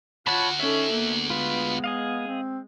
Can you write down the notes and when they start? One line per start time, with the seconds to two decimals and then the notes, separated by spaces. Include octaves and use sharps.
0.27 D2 F4 F#4 C#5 F#5 A5 B5
0.60 C#4 D#4 A4 E5
0.93 A#3 B3
1.30 G#3 F4 B4
1.84 G#4 D#5 F5
2.27 C4